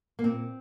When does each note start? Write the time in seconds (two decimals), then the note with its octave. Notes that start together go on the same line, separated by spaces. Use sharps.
0.19 A#3
0.24 A#2 C4